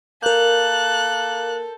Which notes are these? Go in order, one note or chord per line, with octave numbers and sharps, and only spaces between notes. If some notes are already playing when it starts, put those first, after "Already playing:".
A#3 A4 A#4 A5 F#6 G6